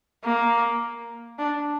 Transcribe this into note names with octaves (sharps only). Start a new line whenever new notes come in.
A#3
D4